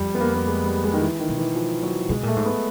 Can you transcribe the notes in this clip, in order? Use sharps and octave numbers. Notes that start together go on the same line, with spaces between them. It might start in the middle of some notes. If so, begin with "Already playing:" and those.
Already playing: F2 G3
B3
A#3
A#3
G#3
G3
G#3
D#3
E3
D#3
B2
E3
F3
F#3
B2 G#3
A#2 A3
G#2
B3